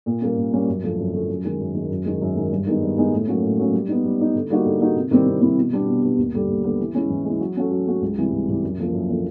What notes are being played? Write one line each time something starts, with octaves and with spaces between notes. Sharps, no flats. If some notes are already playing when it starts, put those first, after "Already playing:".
A#2
G3 A#3 C#4
A#2
G3 A#3 C#4
F#2
D3 F3 A3
F#2
D3 F3 A3
F#2
D#3 G#3
F#2
D#3 G#3
F#2
D#3 G#3
F#2
D#3 G#3
G2
D#3 G#3 B3 D#4
G2
D#3 G#3 B3 D#4
A2
F#3 A#3 C#4
A2
F#3 A#3 C#4
G3
B3 D#4
G3
B3 D#4
D3
G3 A#3 D#4 F#4
D3
G3 A#3 D#4 F#4
C3
D#3 G3 C4 E4
C3
D#3 G3 C4 E4
B2
G3 B3 D4
B2
G3 B3 D4
D#2
D3 G3 B3
D#2
D3 G3 B3
E3
G#3 C#4 E4
E3
G#3 C#4 E4
F#3
A3 C#4 F#4 A4
F#3
A3 C#4 F#4 A4
C#2
C3 E3 G3
C#2
C3 E3 G3
F#2
D3 F3 A#3
F#2
D3 F3 A#3